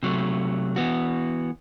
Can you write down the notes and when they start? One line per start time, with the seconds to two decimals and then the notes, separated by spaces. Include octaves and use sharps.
0.03 C3 F#3 A3
0.76 E3 B3 F#4